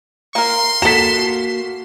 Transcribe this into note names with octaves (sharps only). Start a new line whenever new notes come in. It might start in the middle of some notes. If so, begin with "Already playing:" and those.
A#3 A#4 C6
A#3 F#4 A4 A#5 B6 E7